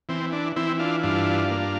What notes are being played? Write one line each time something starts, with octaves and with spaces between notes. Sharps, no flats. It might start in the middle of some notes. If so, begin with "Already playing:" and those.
E3 C4
D4
E3 C4 E4
D4 F4
G2 D4 F4
A#3